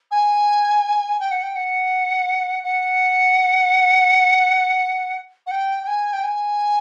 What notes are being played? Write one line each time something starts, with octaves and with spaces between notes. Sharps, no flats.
G#5
G5
F#5
G5
F#5
F#5
F#5
G5
G5
G#5
G5
G#5